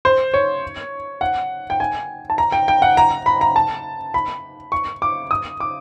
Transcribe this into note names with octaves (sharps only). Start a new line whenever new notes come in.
C5
C#5
F#5
G5
G#5
A5
A#5
G5
G5
F#5
A#5
B5
A#5
A5
B5
C#6
D6
D#6
D6